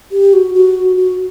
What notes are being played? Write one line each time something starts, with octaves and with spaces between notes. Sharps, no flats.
G4
F#4
F#4
F#4